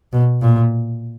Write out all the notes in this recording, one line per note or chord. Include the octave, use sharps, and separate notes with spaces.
B2
A#2